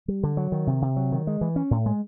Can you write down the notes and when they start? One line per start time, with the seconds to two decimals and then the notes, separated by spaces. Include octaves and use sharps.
0.08 G3
0.23 D3
0.37 F#3
0.52 D#3
0.67 C3
0.82 C3
0.96 F#3
1.12 D#3
1.27 G#3
1.41 E3
1.56 C#4
1.71 A2
1.86 G#3